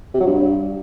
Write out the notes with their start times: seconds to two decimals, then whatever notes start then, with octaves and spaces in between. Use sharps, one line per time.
0.15 C3
0.21 F#3
0.27 G2